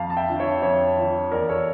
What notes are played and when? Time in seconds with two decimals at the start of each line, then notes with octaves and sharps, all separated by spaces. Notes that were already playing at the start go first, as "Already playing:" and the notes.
Already playing: F2 F5 A5
0.10 A5
0.17 E5 G5
0.29 D3 F3
0.40 C#5 E5
0.62 F2 C#5 E5
0.98 D3 F3
1.32 E2 A#4 D5
1.49 A4 C#5